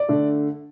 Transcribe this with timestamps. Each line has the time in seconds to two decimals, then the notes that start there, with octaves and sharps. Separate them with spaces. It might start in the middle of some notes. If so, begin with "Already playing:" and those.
Already playing: D5
0.08 D3 A3